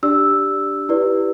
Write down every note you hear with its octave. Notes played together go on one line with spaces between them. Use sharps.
D4 G4 D5 E6
E4 G4 B4 D5